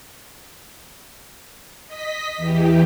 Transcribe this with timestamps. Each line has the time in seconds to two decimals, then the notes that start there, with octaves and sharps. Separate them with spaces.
1.86 D#5 B6
2.36 E2 E3 G4